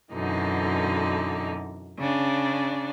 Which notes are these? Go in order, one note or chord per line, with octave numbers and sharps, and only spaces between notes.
F#2 B2 D3 E3 D#4
C#3 D4